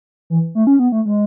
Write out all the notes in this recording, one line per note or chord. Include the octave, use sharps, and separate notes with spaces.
E3
A3
C#4
B3
A3
G#3